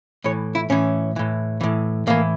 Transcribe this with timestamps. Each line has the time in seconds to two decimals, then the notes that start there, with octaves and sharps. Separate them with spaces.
0.24 A2 E3 C#5
0.55 E4
0.70 A2 E3 C#4
1.16 A2 E3
1.61 A2 E3
2.07 A2 E3 A#3